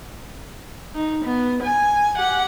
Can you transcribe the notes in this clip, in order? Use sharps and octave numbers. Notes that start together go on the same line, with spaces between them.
D#4
B3
G#5
G4 F#5